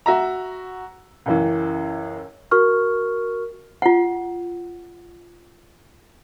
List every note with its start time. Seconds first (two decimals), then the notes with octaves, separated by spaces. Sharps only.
0.06 F#4 E5 A#5
1.26 C#2 F#2 E3
2.51 F#4 A#4 C#6 F6
3.82 F4 F#5